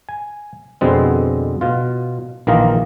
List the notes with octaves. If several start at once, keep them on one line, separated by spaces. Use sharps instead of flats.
G#5
F2 B2 D3 G#3 B3 C4
B2 F4
A#1 D#3 E3 A#3 F4 D#5